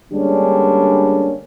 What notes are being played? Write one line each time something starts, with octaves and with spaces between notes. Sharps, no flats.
D3 G3 G#3 A#3 C#4 D4